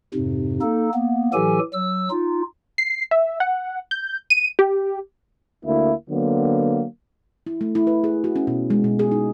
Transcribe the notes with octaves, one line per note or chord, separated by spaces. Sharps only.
F2 G#2 C3
A#3 D#4 A4
A#3 B3
A2 E3 F#3 G4 A4 G#5
F#3 E6
D#4 F4
C7
E5
F#5
G6
D#7
G4
D2 A#3 E4
D3 F#3 A#3 B3
E4
A3
E4
B4
G#4
F#4
C#4
B2
G#3
B2
G#4
D#4